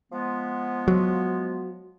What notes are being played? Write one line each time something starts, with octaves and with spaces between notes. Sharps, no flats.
F3 G#3 B3
F#3